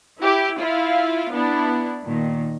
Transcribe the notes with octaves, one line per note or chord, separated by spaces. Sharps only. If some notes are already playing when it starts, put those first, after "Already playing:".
E4 G4
E4 F4 F5
B3 D4 E4
A#2 D#3